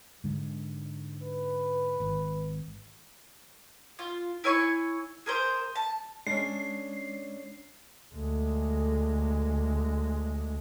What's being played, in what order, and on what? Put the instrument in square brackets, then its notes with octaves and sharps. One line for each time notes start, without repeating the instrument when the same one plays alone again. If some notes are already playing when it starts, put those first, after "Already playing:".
[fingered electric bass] G#2 D3 G#3
[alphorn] B4
[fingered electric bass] G#1
[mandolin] F4
E4 C#5 G#5 C#6
G#4 A#4 C5
A5
[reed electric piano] G#3 [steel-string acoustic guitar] C#4 D4 [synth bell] C7
[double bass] D2 G#3